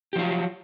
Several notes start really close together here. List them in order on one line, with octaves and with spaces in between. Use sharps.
G4 F3 F4 F#3